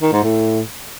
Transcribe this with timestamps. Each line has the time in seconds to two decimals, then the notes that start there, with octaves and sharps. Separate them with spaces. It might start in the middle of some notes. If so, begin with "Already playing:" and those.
0.02 D#3
0.12 G#2
0.23 A2